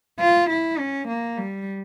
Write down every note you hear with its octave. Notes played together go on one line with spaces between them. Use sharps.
F4
E4
C#4
A#3
G3